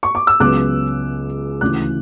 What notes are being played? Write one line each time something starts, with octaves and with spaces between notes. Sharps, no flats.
C#6
D6
E6
C#2 C#3 F#3 B3 D6 F#6
D2 C#3 E3 D6 F#6